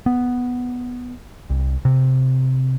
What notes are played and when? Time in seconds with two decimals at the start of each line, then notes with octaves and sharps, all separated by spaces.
0.06 B3
1.50 C2
1.85 C3